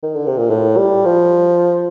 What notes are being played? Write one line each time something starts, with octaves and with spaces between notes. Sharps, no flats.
D#3
D3
C3
A#2
A2
G3
F3